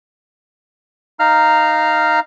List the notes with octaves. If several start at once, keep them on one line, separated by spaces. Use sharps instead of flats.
D#4 F5 A#5 F6